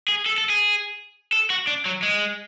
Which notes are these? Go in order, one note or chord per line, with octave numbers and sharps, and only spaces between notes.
G#4
A4
A4
G#4
A4
F#4
D4
F#3
G#3